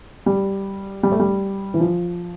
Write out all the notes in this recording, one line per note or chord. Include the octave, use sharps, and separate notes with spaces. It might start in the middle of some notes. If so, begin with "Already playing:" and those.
G3
G3
A3
G3
E3
F3